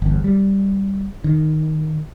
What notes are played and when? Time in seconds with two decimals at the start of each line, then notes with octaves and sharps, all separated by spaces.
0.02 G1 E2
0.24 G3
1.24 D#3